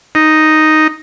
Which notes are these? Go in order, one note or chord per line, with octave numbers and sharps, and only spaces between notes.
D#4